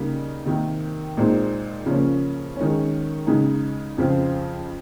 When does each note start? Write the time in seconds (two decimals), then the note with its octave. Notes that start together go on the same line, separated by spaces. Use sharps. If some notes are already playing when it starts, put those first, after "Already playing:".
Already playing: C#3 G3 A#3 D#4
0.46 C3 D#3 A#3
1.17 A#2 G#3 C4 D#4
1.86 C#3 F3 A#3 C#4
2.56 D#3 G#3 C#4
3.27 C#3 G#3 D#4
3.97 F2 C#3 F3 C4 F4